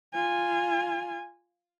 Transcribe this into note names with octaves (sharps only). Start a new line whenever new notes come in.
F4 G#5